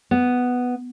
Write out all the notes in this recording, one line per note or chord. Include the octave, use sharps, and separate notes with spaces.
B3